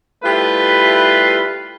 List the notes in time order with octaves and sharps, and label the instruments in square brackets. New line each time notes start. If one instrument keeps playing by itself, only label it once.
[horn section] G3 A3 E4 F4 B4